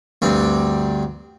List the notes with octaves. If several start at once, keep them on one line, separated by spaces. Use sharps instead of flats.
D2 G2 C4